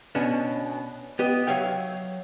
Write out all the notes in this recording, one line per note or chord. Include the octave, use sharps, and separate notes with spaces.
B2 C#4 D4
B3 G4 D#5
F#3 C#5 E5 F5 G5